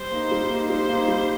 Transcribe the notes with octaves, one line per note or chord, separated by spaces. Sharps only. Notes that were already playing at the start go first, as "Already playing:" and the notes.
Already playing: G3 C5
A#3 D#4
G3
A#3 D#4
G3 C5
A#3 D#4
G3